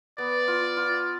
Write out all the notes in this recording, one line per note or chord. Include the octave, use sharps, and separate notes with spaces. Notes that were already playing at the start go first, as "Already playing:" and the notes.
B3 D5
F4
F4